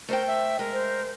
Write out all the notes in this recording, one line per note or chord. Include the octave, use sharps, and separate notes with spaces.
A3 A#4 C5 G5
E5
G#3 A#4
C5